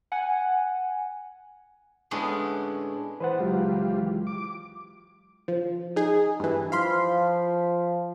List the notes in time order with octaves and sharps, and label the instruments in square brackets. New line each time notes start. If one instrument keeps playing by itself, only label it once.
[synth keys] F#5 G#5
[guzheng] A2 D3 G#3 B3 C#4
[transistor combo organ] E3 [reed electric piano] B4 C5 F#5
[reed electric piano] C#2 F#3 G#3 [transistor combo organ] E3 F4 G4
[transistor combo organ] D6
[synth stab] F3
D#4 G#4
G2 E3
[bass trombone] F3 [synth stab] F5 B5 C6